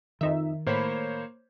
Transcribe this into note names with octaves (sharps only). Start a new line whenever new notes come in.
F2 D#3 D#4 E5
A2 A#3 C5 C#5 B5